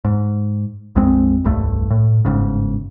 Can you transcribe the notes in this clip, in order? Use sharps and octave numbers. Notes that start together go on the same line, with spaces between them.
G#2
A#1 F2 G#3 C4
D#1 C2 G2 A3
A2
G1 G#2 C#3